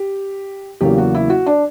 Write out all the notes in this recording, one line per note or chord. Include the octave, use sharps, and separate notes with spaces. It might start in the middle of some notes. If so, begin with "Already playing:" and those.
Already playing: G4
E2 C#3 F#3 A#3 G4
F#4
E4
F#4
D4